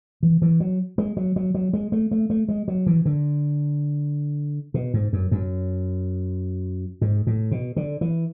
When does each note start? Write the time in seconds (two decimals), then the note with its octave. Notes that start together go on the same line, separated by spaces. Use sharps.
0.23 E3
0.42 E3
0.60 F#3
0.98 G#3
1.17 F#3
1.36 F#3
1.54 F#3
1.73 G#3
1.92 A3
2.11 A3
2.30 A3
2.49 G#3
2.68 F#3
2.86 E3
3.05 D3
4.74 B2
4.94 G#2
5.13 F#2
5.31 F#2
7.01 G#2
7.27 A2
7.51 B2
7.76 D3
8.01 E3